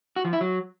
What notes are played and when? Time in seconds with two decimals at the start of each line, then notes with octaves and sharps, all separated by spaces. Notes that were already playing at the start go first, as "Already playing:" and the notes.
0.16 F#4
0.25 F3
0.33 E4
0.41 F#3